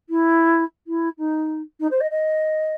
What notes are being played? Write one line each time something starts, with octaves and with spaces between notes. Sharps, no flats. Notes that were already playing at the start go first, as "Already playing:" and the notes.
E4
E4
D#4
D#4
C5
D#5
D#5